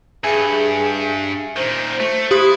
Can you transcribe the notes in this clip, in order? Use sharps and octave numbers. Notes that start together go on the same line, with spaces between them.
G2 G#4 E5 G#5 C#7
A#2 D#3 C5
A3
E4 G4 C5 D#6